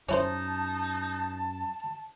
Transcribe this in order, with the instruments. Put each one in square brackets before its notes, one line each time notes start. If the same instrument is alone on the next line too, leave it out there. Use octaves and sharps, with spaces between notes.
[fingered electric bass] F#2 [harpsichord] C#4 E4 C5 [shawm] D#4 [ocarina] A5